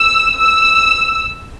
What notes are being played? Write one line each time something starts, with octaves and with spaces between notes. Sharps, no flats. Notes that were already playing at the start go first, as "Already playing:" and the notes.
Already playing: E6
E6